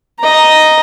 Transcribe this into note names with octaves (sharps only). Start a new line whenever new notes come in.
D#5 A#5